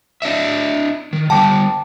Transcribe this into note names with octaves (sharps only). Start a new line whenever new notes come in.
D4 D#5 E5
D#3
D3 G3 G5 A5 D6